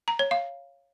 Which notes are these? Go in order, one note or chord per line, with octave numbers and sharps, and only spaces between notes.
A#5
C#5
F5